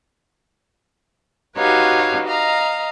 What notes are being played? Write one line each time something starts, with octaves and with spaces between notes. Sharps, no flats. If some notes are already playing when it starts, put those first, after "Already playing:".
D#4 F#4 G4 B4 C#5 F5
D#5 F5 A#5